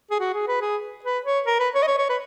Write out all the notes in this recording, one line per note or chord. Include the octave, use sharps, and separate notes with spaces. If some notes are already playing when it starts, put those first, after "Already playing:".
G#4
F#4
G#4
B4
G#4
B4
C#5
A#4
B4
C#5
D#5
C#5
C#5
B4